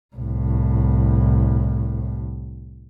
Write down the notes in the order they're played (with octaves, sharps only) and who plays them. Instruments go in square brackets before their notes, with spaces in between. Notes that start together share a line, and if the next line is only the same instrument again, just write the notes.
[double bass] C2 A2